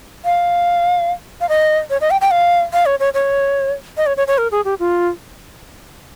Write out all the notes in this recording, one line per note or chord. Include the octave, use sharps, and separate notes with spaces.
F5
F5
D#5
C#5
D#5
G5
G5
F5
F5
C#5
C#5
C#5
D#5
C#5
C#5
C#5
A#4
G#4
G4
F4